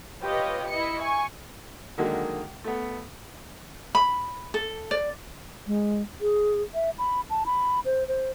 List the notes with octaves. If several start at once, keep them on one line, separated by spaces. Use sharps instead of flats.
F4 G4 B4 C#5 D#5
E4 D#5 C#7
G#5 C#6
D3 D#3 F#3 G#3 A#3
A3 B3
B5
A4
D5
G#3
G#4
E5
B5
A5
B5
C5
C5